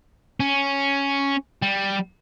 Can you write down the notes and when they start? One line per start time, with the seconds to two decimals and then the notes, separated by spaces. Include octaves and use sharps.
0.40 C#4
1.62 G3